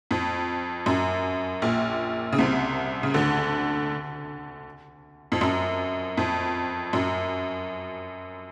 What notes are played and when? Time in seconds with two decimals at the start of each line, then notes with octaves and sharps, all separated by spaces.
0.11 F2
0.86 F#2
1.62 A#1 A#2
2.32 C#3
2.38 C2 C3
3.03 C#3
3.14 D2 D3
5.32 F2
5.41 F#2
6.17 F2
6.93 F#2